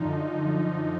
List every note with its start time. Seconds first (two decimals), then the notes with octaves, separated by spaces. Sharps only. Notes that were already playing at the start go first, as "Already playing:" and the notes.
Already playing: F#2 D3 F3 D#4